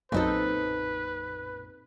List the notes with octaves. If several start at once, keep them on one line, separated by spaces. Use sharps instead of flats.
B1 F#2 A#2 C4 D#4 A4 B4